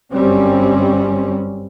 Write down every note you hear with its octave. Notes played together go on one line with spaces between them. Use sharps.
G1 F#2 G3 C4 C#4